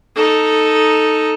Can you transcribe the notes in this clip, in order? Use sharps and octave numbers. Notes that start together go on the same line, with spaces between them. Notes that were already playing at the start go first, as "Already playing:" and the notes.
D#4 A4